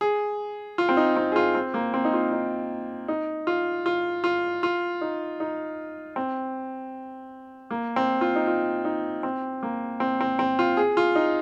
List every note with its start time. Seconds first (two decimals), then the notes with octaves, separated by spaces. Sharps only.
0.01 G#4
0.78 F4
0.89 C4
0.97 D#4
1.16 C4
1.32 G#4
1.36 F4
1.55 C4
1.74 A#3
1.94 C4
2.05 D#4
2.13 F4
2.33 D#4
3.08 D#4
3.47 F4
3.86 F4
4.24 F4
4.63 F4
5.01 D#4
5.40 D#4
6.16 C4
7.71 A#3
7.96 C4
8.21 F4
8.36 D#4
8.47 F4
8.85 D#4
9.23 C4
9.63 A#3
10.00 C4
10.21 C4
10.39 C4
10.59 F4
10.77 G#4
10.97 F4
11.16 D#4